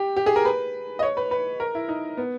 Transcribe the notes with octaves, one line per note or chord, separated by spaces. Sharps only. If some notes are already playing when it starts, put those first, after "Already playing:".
Already playing: G4
G4
G#4
A#4
B4
D#5
C#5
B4
B4
A#4
E4
D#4
B3